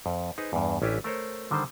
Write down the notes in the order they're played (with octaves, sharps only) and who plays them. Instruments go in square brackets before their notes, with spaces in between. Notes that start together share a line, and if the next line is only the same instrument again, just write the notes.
[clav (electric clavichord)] F2
D#4 G#4 B4 C5
E2 G2
A1 C#4 D4 E4 G4 G#5
A3 A#4 C5 C#5
D3 D#3 G3 C5